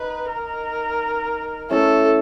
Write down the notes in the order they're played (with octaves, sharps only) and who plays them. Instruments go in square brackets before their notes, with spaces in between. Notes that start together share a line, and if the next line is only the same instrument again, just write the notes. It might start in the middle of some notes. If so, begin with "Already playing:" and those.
Already playing: [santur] D#4 [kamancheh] B4
[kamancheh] A#4
[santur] A3 C#4 E4 [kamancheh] A4